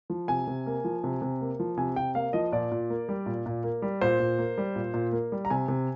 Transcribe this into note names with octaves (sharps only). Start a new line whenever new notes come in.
F3
C3 G#5
C3
A#3
F3
C3
C3
A#3
F3
C3 G#5
C3 G5
A#3 F5
F3 D#5
A#2 D5
A#2
A#3
G3
A#2
A#2
A#3
G3
A#2 C5
A#2
A#3
G3
A#2
A#2
A#3
G3
A#5
C3 G#5
C3